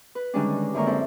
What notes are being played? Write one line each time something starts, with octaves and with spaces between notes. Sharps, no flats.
B4
D3 D#3 G3 G#3 C#4 D4
G#3
F#2 D3 G#3 A#3 A#4 C#6
C4 E4 A4 C5